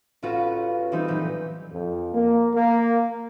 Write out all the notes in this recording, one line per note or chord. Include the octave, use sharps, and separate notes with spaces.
A1 C#4 F4 F#4 B4
E3 G3 C4 D#4 B4
A#2 E3 F#3 G4
F2
A#3
A#3